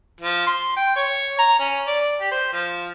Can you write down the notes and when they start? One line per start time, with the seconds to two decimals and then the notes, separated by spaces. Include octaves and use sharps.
0.21 F3
0.47 C6
0.76 G5
0.96 C#5
1.39 A#5
1.59 C#4
1.87 D5
2.20 G4
2.32 C5
2.53 F3